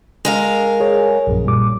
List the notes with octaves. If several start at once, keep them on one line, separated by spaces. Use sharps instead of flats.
G#3 A#4 F5
G#4 C#5
A#1 F#2
A#2 G3 D6